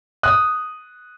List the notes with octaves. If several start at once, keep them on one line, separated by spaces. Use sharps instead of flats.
D#6 F#6